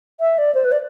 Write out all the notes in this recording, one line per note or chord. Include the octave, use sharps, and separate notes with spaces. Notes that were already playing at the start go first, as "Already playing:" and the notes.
E5
D5
C5
B4
D5